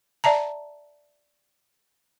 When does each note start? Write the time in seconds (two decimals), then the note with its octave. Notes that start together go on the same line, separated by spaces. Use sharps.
0.24 D5 E5 A5 A#5